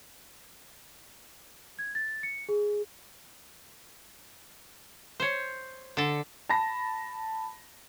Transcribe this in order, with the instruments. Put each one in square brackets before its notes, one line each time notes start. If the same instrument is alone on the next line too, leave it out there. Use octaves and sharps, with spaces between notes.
[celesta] G#6
A6
C#7
G#4
[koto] C5 C#5
D3 A4
[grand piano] A5 B5 A#6